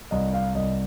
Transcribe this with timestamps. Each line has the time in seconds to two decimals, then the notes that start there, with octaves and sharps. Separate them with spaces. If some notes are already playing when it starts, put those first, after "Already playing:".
0.11 C2 D#5
0.34 F5
0.55 C2 D#5